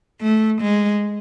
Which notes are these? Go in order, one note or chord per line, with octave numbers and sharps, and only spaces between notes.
A3
G#3